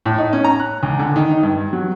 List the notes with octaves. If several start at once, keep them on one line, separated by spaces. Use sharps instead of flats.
A2
D#4
C#4
A#5
F#6
C#2
D3
D#3
D#4
G2
F#3